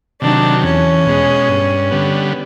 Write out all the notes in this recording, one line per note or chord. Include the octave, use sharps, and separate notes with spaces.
C3 D#3 F#3 D4
E2 C#4
B2 G#3
G2
D3 G3 B3